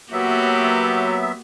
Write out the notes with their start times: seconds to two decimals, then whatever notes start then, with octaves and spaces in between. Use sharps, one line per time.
0.12 F#3 A#3 B3 F#4 G4 E5